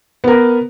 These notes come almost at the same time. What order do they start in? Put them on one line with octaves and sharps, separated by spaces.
B3 A#4 B4